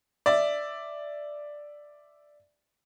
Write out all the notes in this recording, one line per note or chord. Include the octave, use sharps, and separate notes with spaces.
D5 E5